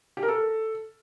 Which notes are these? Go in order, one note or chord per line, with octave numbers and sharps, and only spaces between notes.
G4
A#4
A4